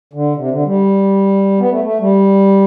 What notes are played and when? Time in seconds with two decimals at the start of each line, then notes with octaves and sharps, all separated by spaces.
0.13 D3
0.36 C3
0.50 D3
0.65 G3
1.60 B3
1.70 A3
1.84 A3
2.00 G3